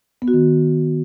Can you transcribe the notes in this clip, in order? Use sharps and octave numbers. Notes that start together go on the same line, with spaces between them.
B3
F#4
D#3